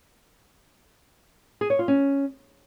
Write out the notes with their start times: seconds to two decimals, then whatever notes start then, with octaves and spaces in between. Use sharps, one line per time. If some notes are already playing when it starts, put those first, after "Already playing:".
1.61 G#4
1.70 C#5
1.79 F4
1.88 C#4